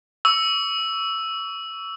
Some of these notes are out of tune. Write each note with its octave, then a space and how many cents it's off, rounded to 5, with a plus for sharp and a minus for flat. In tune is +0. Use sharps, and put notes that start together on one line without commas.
C#6 +40 E6 +0